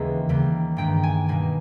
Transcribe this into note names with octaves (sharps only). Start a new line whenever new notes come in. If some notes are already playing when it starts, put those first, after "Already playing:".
Already playing: D#2 C#3 E3 G#3 B3 D#5
D#2 C#3 G3
G2 D#3 G#3 B3 G5
G#5
B2 G3 A#3 G#5